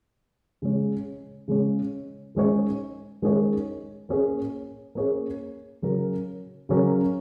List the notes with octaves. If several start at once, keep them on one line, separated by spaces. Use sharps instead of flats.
C#3 G#3 C#4
C#3 G#3 C#4
D#3 G#3 C#4 G#4 C#5
D#3 G#3 C#4 G#4 C#5
A#3 C#4 G#4 C#5
A#3 C#4 G#4 C#5
C#3 F#3 C#4 A#4
C#3 F#3 C#4 A#4